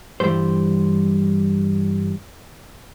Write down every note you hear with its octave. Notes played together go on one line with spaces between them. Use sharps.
G2 D#3 E3 G3 C5